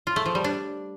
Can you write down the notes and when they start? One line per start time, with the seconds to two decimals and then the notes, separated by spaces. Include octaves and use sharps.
0.07 F4
0.16 A3
0.26 F3
0.35 G3
0.44 D4